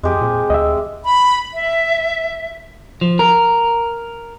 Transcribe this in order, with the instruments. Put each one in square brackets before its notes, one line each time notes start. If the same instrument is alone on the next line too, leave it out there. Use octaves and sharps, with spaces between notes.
[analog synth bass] F2 [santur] G#3 G4 D#6
[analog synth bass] A#2 [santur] C4
[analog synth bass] D2 [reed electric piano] D#5 E5
[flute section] B5
E5
[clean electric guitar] F3
A#4